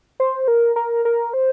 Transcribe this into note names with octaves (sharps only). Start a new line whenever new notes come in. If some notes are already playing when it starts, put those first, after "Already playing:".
C5
A#4
A#4
A#4
C5